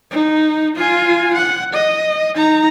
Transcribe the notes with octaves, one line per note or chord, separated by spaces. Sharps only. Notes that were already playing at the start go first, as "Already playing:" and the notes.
D#4
F4 G#5
F#5
D#5
D#4 A#5